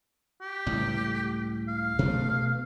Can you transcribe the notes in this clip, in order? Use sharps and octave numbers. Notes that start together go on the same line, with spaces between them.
G4
C#2 A2 G3
F5
B2 A3 B3